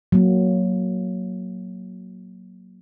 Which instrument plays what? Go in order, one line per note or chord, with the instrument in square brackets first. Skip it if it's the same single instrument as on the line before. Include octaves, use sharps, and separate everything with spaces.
[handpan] F#3 A#3